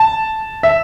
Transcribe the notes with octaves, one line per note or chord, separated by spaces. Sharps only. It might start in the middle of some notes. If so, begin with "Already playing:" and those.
Already playing: A5
E5